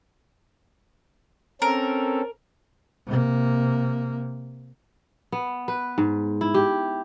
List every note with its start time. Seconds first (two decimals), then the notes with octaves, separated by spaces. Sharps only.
1.62 C4 C#4 A4 A#4
3.06 C3 A#3
5.32 B3
5.68 B4
5.98 G#2
6.41 E4
6.54 G4